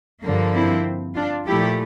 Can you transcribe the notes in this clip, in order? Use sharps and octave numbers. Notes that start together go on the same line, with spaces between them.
G2 D3 F3 A#3
C4 E4
D4 F4
A#2 F3 A3 E4 G4